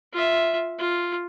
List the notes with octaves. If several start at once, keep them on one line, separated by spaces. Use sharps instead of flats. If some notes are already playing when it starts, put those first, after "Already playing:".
F4 E5
F4